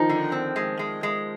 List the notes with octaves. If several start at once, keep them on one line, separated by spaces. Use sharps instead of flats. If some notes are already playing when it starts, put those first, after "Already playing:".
Already playing: D#3 F3 D#4
D3
C4
G#3
G#3
G#3